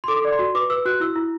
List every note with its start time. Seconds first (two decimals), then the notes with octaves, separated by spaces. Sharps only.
0.04 C6
0.08 A4 D6
0.25 D5
0.32 C6
0.39 F#4
0.55 B4 D6
0.70 B4 E6
0.86 F#4 F#6
1.00 E4 E6
1.16 E4